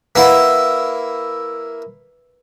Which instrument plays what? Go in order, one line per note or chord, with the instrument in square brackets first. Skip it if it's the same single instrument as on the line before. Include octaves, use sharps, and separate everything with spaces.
[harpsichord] A#3 E4 [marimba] B4 F#5